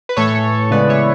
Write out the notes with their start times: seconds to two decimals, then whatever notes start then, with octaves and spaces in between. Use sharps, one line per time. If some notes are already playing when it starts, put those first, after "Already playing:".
0.09 B4
0.17 A2 E3 A3 A4 C#5
0.71 C#3 E3 G#3 B3 B4 D5
0.89 C#5 E5